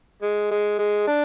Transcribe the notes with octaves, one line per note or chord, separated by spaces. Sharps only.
G#3
G#3
G#3
D4